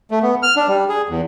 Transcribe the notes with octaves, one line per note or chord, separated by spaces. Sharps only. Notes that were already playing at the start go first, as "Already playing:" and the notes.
A3
B3
F6
D4
G3
G#4
E2